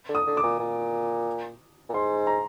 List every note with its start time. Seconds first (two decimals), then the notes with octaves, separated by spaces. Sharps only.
0.09 D3
0.15 D#6
0.27 D3
0.37 D6
0.43 A#2
0.60 A#2
1.89 A#2
1.94 G#2 C6
2.27 A#5